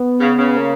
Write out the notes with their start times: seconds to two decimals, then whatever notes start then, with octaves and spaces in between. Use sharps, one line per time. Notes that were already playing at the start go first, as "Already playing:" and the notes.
Already playing: B3
0.20 C#3
0.39 C#3
0.57 A#3